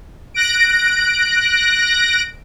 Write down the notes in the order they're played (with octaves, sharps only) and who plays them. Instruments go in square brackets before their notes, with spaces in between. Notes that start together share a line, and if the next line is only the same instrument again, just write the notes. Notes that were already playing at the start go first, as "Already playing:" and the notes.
[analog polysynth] F#6 A#6 D7